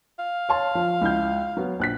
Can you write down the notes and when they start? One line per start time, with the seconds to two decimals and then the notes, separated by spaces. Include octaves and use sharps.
0.19 F5
0.49 C#5 A5 C6
0.75 F3
1.01 C#2 E4 G6
1.57 F#3 B3 F#4
1.79 A#1 F#6 B6